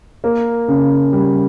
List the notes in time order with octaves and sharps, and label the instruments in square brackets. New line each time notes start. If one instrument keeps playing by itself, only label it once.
[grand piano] A#3
C#3
G3